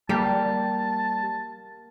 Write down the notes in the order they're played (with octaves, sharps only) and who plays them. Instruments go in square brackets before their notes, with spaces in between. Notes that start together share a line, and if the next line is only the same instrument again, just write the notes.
[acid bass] G3 [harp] A#3 G4 [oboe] A5